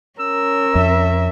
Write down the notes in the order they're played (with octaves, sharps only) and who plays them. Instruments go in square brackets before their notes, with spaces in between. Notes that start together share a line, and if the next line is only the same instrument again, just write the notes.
[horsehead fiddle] C#4 A#4 [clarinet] E6
[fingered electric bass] F2 [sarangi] E5